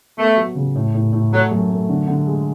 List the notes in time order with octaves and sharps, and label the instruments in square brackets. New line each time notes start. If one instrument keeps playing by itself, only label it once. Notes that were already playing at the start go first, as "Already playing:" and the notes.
[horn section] A3 [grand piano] B3
[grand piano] F#3
C#3
A2
A2
A2
[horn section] F#3 [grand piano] A3
[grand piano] F#2
A3
D3
D3
G#3